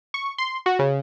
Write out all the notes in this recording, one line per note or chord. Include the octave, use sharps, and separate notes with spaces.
C#6
C6
F#4
C#3